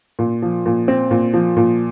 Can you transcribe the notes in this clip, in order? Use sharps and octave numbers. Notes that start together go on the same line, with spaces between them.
A#2
F3
A#2
C4
A#2
F3
A#2